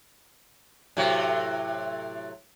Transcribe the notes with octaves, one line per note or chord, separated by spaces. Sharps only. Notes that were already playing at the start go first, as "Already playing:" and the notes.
A2 C3 F#3